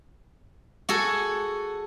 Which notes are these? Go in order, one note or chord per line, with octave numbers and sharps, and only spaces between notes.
F#4 G#4 A4